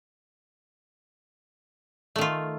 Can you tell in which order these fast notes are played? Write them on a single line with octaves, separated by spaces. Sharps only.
A3 D#3 F4